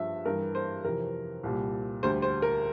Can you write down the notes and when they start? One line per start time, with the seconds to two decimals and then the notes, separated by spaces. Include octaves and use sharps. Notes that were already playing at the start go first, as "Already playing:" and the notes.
Already playing: G2 F3 E5
0.25 G2 E3 G3 A#4
0.55 C5
0.84 F2 C3 E3 A#4
1.43 C2 A#2 G3
2.03 D2 D3 G3 C5
2.22 C5
2.42 A#4